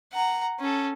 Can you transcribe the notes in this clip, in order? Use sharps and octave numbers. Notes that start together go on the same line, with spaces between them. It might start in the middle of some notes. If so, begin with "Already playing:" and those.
F#5 A#5
C#4 A4